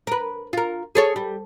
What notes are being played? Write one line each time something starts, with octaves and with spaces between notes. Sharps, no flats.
A#4 B4
F4 A#4
G#4 A4 C#5
G3